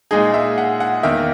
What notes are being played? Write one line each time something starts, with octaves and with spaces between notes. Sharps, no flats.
A#2 G#3 D#4 G#4
E5
F#5
F#5
E2 D#3 A#3 E5